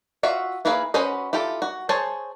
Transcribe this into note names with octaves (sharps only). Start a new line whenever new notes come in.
F4 F#4 E5 F5
A#3 E4 G#4 B4 F5
C#4 F#4 B4 C5 D#5
E4 F4 G4 A4
F#4
G#4 C5 C#5 G#5 A5